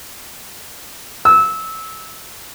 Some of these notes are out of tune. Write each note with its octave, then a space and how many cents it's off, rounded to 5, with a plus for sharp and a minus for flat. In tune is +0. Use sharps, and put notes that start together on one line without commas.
E6 -20